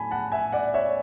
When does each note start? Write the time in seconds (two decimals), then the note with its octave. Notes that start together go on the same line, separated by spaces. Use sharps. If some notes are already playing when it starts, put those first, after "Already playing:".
Already playing: A2 F#3 A3 G#5 A5 B5
0.11 F#5 A5
0.32 E5 G#5
0.52 D5 F#5
0.74 C#5 E5